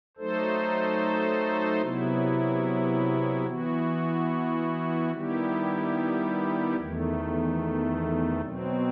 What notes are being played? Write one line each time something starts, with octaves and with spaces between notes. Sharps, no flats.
F#3 A3 D#4 A4 C5
C3 F#3 B3 E4
E3 B3 F#4
D#3 G3 B3 E4 G4
E2 D#3 A3
B2 F#3 C4